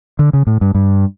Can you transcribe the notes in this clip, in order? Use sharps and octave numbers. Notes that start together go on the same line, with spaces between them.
D3
C#3
A2
G2
G2